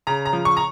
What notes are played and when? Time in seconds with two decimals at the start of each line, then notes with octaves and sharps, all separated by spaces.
0.07 C#3 A#5
0.26 A#5
0.33 F3
0.45 C#6
0.57 A#5